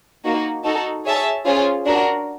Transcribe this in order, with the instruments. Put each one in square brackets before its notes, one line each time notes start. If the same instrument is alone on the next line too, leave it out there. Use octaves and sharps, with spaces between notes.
[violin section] A#3 D#4 F#4
D#4 F#4 A4
G#4 C#5 E5 A5
C#4 F4 G#4 C5
D4 F#4 A#4